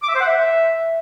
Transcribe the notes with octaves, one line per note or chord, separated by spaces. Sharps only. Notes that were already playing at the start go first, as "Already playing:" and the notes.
D6
E5
C5
F#5
E5